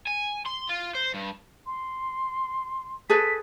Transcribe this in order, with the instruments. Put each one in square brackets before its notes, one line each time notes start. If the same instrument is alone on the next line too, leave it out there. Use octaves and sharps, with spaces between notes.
[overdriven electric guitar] G#5
C6
F4
C5
G2
[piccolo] C6
[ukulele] G#4 A4 B4 [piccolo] B6